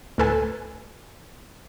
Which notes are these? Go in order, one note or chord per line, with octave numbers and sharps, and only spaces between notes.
D2 A2 A4 B4 G#5